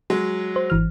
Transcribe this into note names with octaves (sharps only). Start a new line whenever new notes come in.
F#3 G#3
C5
G#1 E3 F6